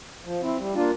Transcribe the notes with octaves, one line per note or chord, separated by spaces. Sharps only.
F3
C4 E4
G3
A#3 D4 F4